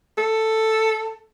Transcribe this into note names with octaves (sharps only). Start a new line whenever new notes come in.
A4